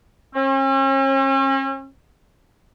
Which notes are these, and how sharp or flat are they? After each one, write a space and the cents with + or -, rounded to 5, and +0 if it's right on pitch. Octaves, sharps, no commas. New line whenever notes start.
C#4 -40